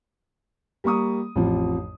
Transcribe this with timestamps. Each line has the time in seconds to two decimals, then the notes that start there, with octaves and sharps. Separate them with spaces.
0.84 G3 A#3 A#5 C#6 D#6
1.36 A1 F2 F3